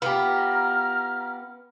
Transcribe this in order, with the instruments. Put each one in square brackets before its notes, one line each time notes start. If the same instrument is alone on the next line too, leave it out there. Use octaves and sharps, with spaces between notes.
[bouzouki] B3 [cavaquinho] F4 G4 [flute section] A#5 F6